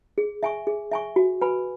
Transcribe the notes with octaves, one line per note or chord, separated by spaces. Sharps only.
G#4
E5 G#5 C#6
G#4
E5 G#5 C#6
F#4
B4 G#5 B5